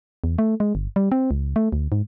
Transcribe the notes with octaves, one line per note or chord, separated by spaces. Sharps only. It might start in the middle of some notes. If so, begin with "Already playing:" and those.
E2
A3
G#3
G1
G3
C4
C#2
A3
D2
G#2